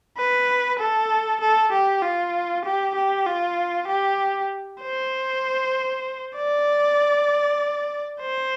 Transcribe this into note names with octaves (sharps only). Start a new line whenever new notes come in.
B4
A4
A4
G4
F4
G4
G4
F4
G4
C5
D5
C5